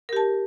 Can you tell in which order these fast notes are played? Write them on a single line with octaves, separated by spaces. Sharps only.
A#4 G4 A5